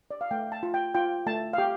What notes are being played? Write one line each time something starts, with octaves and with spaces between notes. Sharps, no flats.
D5
F5
A3 G5
A5
F4
G5
F4 G5
A3 A5
F5
G4 G5